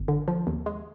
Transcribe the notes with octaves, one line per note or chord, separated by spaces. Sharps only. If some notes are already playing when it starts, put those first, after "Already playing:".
Already playing: G1
D3
F3
D#2
G#3